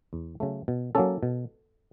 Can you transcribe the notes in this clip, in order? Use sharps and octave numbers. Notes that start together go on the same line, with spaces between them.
E2
C#3 F#3 A3
B2
F#3 A#3 C#4 A4
B2